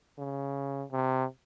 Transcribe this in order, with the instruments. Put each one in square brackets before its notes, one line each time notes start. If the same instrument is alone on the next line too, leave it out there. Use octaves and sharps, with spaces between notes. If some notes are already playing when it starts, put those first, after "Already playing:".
[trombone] C#3
C3